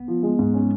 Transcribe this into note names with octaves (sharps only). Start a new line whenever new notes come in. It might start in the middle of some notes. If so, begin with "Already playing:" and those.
Already playing: B3
F3
G#3
G#2
C#4